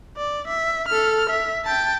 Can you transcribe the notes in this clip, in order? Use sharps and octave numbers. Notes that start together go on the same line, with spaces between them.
D5
E5
A4 F6
E5
G5 A5